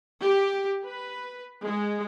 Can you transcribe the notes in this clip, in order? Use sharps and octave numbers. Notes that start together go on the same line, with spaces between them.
G4
B4
G#3